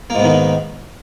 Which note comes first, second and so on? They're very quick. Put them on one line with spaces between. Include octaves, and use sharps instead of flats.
A#3 G#2 B3 D#3